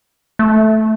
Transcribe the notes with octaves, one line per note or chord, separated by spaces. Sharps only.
A3